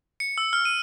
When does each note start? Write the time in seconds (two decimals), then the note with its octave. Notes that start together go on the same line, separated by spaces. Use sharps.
0.20 C#7
0.38 E6
0.53 F6
0.65 D#7